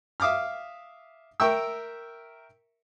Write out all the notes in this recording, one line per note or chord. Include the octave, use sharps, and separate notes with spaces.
E5 F5 D6 D#6 F6
A#4 E5 G5 C#6 E6